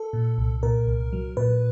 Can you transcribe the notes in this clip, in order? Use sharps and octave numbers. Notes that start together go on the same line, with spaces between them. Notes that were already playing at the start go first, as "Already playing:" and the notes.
Already playing: A4
A#2
C2
A#2 A#4
C2
F#3
A#2 B4